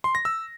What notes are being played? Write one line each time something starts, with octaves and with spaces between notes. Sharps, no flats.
C6
A#6
E6